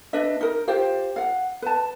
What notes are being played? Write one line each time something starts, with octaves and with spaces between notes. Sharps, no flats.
D4 B4 D#5 E5
D#4 A#4
F4 G4 C5 F5
F5 F#5
B4 A5